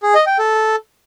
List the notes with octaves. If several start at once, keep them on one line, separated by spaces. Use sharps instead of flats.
G#4
D#5
G5
A4